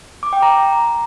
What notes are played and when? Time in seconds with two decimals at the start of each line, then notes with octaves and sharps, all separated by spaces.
0.23 D6
0.33 G5
0.42 A#5